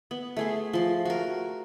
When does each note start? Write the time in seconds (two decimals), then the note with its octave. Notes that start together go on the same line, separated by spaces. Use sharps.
0.11 B3
0.37 A3 G#4 C6
0.73 F3 C6
1.05 F#4 A#4